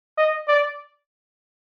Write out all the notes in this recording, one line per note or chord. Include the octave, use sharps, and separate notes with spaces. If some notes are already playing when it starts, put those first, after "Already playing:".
D#5
D5